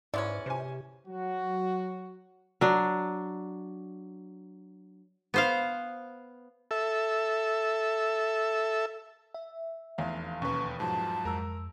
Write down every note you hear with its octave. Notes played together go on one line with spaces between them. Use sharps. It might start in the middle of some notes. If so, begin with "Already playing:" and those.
G#2 E3 G#3 C#4 D5
C3 C5 G#5
F#3 F#4
F#3 D4
B3 C5 F5
A4 E5
E5
F1 E2 F5
D#2 B2 C#4 B4 C#6
G#2 F3 F#3 A5
F2 G#3 A#4 E6